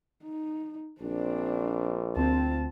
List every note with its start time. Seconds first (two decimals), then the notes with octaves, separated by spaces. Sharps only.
0.23 D#4
1.01 A#1 C4 D4
2.17 D2 C4 F4 A5